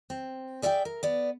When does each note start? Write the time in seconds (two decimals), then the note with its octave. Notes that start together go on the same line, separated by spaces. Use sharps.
0.10 C4
0.62 G#4 D5 E5 F5 G5
0.85 A#4
1.03 B3 D5